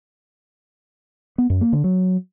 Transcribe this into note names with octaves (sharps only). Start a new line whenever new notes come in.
B3
F#2
A#3
D3
F#3